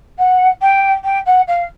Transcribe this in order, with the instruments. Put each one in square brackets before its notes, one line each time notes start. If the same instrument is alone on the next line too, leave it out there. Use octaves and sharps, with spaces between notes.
[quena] F#5
G5
G5
F#5
F5